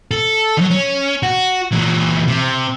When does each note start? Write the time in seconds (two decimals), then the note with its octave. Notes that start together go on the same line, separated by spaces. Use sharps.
0.11 A4
0.58 D#3 F#3
0.71 C#4
1.23 F#4
1.72 A#2 E3
2.28 C3